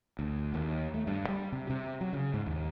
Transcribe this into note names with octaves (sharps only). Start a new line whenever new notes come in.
D2
D#2
A3
G2
G3
C3
C3
F#3
C#3
G#2
D#2